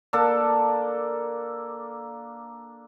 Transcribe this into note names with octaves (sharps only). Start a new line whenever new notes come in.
A#3 D4 A4